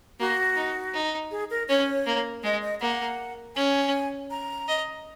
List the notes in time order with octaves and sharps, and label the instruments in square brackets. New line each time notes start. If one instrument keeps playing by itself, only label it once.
[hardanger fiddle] A#3 [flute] F#4
[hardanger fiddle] D#4
D#4
[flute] G#4
A#4
[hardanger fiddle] C#4 [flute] C#5
[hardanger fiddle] A#3
[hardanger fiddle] G#3 [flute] D#5
[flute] D#5
[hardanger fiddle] A#3 [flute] F#5
[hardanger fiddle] C#4 [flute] G#5
[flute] A#5
[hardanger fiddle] D#5